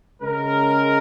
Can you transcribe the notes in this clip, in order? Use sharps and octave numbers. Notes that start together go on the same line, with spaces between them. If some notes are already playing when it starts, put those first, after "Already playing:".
C#3 G#3 A#4